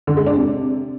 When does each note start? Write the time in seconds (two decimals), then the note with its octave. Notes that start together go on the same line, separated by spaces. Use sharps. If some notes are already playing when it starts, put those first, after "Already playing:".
0.07 D3
0.17 G#3
0.26 D4
0.36 C3